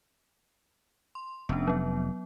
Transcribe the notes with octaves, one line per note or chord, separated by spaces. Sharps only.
C6
F1 B3 C#4 D4
F#3 B3